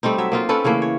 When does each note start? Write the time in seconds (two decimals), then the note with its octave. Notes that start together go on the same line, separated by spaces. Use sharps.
0.03 G3 A3 C4 D#4
0.18 F#3 E5
0.32 A#3 D#4 F4
0.49 C4 C#4 A4 B4
0.64 C#3 E3 A3 A#3
0.82 C#5